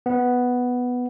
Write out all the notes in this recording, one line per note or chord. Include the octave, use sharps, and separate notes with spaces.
B3